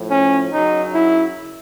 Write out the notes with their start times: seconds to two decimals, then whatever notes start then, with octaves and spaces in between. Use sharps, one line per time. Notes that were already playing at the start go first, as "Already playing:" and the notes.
Already playing: A2 F3
0.10 C#4
0.52 F#2 C#3 F#3 D#4
0.95 E4